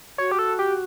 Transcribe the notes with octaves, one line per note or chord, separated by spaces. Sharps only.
F#4 C#5
G4
A4
G4